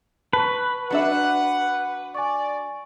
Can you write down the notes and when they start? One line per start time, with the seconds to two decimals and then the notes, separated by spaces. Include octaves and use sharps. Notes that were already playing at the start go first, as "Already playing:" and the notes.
0.33 B4 A5 C#6
0.90 F#3 D4 E5 F#5
2.15 D5 G#5 C#6